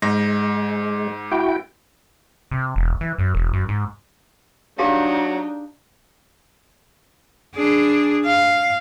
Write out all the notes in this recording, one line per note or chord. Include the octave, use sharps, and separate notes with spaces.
G#2 G#3 A#6
E4 F#4 G5
C3
E1
E3
F#2
E1
F#2
G#2
F#3 D4 D#4 G4 G#4 F5
D4 G#4
F5